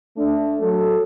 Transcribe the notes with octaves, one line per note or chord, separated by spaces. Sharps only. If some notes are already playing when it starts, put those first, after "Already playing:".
A3 D4
F#3 A4